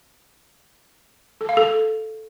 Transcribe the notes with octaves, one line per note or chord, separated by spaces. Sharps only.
A4
F5
A4